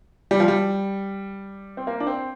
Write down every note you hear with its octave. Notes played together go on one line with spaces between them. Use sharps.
G3
F3
G3
C4
A#3
D4
C4